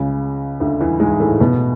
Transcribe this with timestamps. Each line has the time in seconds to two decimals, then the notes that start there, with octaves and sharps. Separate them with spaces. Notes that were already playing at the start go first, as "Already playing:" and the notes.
Already playing: C#2 C#3
0.60 D2 D3
0.80 E2 E3
1.00 G#2 G#3
1.20 A2 A3
1.40 B2 B3